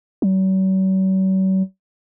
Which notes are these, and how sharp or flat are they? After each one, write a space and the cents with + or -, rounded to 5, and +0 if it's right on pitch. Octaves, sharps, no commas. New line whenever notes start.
F#3 +45